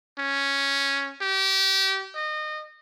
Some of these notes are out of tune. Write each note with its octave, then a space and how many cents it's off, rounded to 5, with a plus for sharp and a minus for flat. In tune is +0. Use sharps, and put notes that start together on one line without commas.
C#4 +0
G4 -25
D#5 -25